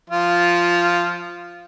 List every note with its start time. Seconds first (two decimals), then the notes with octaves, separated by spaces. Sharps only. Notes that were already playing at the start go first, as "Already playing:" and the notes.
0.10 F3 F4